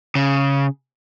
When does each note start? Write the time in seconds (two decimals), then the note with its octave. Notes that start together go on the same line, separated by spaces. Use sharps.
0.15 C#3